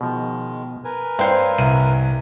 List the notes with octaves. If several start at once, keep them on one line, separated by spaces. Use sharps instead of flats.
B2 D#3 F3 G#3
A#4 B4 G#5
G2 C4 C5 C#5
C2 D#7